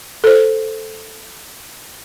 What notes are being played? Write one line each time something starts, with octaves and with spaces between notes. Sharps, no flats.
A4 C5